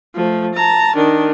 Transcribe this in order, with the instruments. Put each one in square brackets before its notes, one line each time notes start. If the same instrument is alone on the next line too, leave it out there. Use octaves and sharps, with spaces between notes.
[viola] F3 A3
A5 A#5
D#3 D4